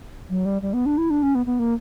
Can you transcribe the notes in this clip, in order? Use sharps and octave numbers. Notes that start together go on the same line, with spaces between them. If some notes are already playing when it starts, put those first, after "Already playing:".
F#3
G3
G3
B3
D4
E4
D4
C#4
B3
B3
A#3